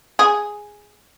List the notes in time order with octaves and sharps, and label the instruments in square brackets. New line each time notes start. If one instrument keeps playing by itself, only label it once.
[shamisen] G#4